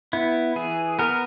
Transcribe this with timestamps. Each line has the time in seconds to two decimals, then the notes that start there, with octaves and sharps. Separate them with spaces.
0.13 B3 E4
0.56 E3 G#4
0.99 B3 A#4